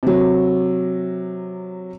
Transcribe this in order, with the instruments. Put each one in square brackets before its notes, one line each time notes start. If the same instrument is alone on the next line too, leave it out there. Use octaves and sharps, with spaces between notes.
[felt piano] C3 F#3